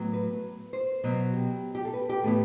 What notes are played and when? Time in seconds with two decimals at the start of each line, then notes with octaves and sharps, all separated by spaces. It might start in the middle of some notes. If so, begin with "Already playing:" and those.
Already playing: A2 F#3 B3
0.13 B4
0.73 C5
1.04 B2 F#3 B3
1.33 G4
1.75 G4
1.85 A4
1.93 B4
2.09 G4
2.23 A2 E3 B3 E4 A4